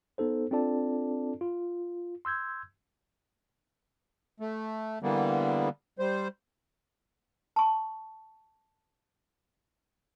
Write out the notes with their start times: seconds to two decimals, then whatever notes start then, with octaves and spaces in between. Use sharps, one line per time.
0.18 B3 D#4 A4 C5
0.51 C4 D4 F4 A4 D5 A5
1.41 F4
2.25 C6 E6 G6 G#6
4.40 A3
5.03 D3 E3 G3 A#3 B3
5.99 G3 C5
7.56 A5 C#6